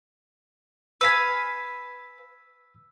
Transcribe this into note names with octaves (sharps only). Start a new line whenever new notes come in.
B4 F5 G#5 E6 B6